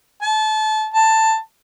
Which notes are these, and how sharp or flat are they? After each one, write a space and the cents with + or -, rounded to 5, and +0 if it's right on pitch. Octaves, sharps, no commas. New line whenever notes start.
A5 -25
A5 +10